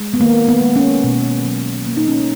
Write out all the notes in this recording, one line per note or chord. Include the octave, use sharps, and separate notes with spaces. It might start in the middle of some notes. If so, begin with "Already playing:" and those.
Already playing: G#3
B3
D#3 A#3
B3
G#3
C#4
B2
F#3
A#3
D#4
C#4